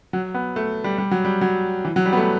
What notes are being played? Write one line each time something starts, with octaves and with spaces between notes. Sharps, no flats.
F#3
B3
A3
G3
G3
F#3
G3
F#3
E3
F#3
G3
B3
A3